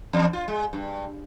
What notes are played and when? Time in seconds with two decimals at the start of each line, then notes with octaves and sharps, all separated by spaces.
0.13 E2
0.33 F4
0.48 G#3
0.73 G2